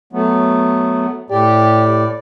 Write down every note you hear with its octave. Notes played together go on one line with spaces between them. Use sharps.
F#3 A3 B3
A2 G4 D5